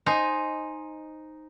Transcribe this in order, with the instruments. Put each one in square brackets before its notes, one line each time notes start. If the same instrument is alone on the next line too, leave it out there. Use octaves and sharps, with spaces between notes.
[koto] D#4 [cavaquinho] C5 D#5 G#5 C6